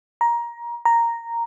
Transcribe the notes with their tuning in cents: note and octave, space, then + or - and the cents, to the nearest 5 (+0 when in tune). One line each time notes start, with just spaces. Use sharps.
A#5 +20
A#5 -5